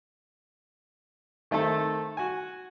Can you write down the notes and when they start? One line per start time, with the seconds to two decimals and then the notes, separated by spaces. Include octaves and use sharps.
1.51 D#3 A3 C4 A4
2.17 F#4 G#5